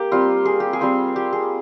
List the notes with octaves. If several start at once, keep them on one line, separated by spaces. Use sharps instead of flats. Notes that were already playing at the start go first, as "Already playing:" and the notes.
Already playing: A#3 G4
G3 C4 F4
G#4
G4
G#4
G3 C4 F4
G4
G#4